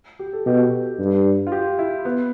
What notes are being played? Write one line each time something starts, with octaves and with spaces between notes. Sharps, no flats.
G4
A4
B2 G4
G2
F4
G4
E4
B3